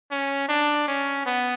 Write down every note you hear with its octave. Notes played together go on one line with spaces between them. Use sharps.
C#4
D4
C#4
B3